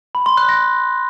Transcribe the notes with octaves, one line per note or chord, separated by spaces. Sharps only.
B5
C6
F#6
A#6